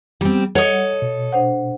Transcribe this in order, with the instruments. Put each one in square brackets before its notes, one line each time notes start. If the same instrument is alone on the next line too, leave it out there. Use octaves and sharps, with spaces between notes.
[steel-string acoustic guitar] G3 C4 [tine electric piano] B3
[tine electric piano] G3 F#5 [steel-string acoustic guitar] A4 [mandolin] C#5 D#5
[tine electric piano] B2
[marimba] D4 C5 F#5